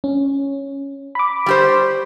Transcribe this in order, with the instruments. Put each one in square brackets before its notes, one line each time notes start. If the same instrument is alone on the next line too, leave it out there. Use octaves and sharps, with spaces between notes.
[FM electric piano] C#4
B5 D6
[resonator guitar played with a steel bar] G3 G4 C5